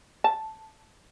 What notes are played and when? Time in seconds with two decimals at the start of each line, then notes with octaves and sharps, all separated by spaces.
0.24 A5